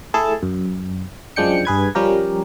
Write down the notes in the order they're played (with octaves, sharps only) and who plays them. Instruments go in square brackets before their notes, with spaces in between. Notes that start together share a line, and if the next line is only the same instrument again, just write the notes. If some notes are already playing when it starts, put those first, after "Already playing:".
[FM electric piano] A3 E4 G#4 A4 A5
F#2
F#2 F3 G#3 D4 G5 C#7
G2 G#4 B4 G#6
F3 G3 C#4 G4 A#4